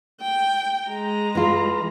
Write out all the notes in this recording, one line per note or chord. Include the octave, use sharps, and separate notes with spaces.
G5
G#3 A#5
E3 F4